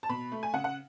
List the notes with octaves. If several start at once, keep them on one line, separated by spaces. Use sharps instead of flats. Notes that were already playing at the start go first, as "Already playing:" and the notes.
A5
B2 B5
A3
G#5
C#3 F#5
F#5